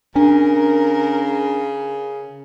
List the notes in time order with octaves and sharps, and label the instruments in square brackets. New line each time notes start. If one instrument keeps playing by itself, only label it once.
[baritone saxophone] C#3 [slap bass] C#4 [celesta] D4 [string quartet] A#4